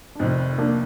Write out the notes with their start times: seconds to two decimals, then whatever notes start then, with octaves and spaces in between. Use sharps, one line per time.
0.15 D4
0.19 F1 F2 C3 D#3 C4 D#4
0.58 A#3 D4